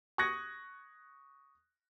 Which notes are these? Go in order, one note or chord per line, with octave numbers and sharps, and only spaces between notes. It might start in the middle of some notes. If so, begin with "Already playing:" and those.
C#6 D#6 F#6 G#6 A#6 C#7